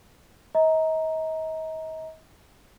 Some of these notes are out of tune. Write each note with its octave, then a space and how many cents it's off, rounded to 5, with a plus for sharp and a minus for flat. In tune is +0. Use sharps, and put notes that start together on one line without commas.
D#5 +40 A#5 +0